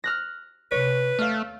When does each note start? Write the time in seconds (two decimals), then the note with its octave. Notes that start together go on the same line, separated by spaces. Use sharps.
0.04 F6 F#6 A#6
0.72 C3 D#4 B4 C#5
1.19 D#2 A3 F5 F6